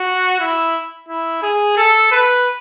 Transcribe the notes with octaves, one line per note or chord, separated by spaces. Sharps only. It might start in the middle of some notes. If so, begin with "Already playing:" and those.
Already playing: F#4
E4
E4
G#4
A4
B4